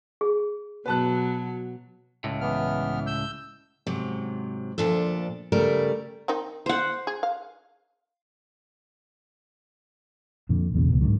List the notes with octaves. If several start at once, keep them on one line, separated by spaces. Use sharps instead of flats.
G#4
B2 F#3 B4 A5 F#6
C#2 A2
E3 B3 F6
E6 G6
G#2 C3 F#3
D2 A#2 F3 D4 A4
C#3 G3 A3 A#4
D#3 C4 D#4
C5 F#5
G#4
F5
F2 A#2 D3
B1 E2 A#2 C#3
C#2 B2
G#2 D3 D#3 F#3